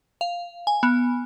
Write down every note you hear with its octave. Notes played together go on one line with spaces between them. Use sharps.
F5
G#5
B3